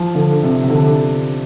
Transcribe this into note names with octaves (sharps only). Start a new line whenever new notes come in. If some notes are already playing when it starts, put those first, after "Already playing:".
Already playing: F3
D3
C3
C3
D3